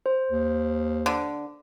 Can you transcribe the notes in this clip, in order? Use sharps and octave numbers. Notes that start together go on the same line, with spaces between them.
C5
D#2
D3